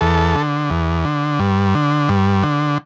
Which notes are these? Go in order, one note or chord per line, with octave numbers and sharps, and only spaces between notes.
E2 A4
D3
E2
D3
G2
D3
G2
D3